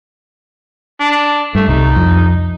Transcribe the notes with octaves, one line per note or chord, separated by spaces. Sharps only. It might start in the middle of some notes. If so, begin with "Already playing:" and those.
D4
G2 A3
C2 D#4
F2